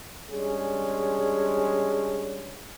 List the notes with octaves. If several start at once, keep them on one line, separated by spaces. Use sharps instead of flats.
G3 G#3 C#4 D4 G#4